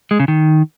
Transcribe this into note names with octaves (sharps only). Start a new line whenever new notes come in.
G#3
C#3
D#3